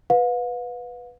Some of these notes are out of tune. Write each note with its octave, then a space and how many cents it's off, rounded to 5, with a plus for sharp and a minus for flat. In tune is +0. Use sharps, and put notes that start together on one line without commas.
B4 +0 F5 +40